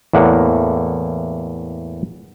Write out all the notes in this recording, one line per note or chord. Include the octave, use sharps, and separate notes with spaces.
E2 A2 A#3 F#5